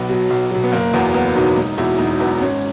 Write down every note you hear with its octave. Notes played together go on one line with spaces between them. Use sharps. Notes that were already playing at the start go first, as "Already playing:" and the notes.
Already playing: B1 B3
B2 F#3
B1
B2 F#3
B3
F#1 A#3
E2 B2 F#3 B3
F#1 B3
E2 B2 F#3 D#4
E1 D#4
E2 B2 F#3 E4
E1 D#4
E2 B2 F#3 B3
D#4
G#1 C#4